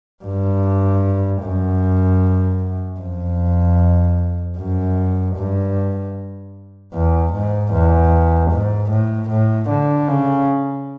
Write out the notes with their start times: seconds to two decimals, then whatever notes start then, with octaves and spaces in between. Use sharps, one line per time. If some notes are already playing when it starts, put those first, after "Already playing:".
0.24 G2
1.42 F#2
2.99 F2
4.57 F#2
5.35 G2
6.93 E2
7.33 G#2
7.72 E2
8.51 G#2
8.90 A2
9.29 A2
9.69 D3
10.08 C#3